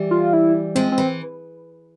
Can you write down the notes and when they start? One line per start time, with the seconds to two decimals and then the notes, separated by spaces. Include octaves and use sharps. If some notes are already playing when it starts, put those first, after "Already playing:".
Already playing: E3 G3
0.11 F4
0.33 E4
0.75 F3 G#3 C4
0.92 C4
0.98 E3